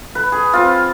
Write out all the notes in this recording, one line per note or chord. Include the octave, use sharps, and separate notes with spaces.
B4
G#4
C4 F4